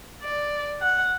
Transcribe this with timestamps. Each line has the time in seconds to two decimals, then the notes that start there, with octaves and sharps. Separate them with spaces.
0.23 D5
0.81 F#5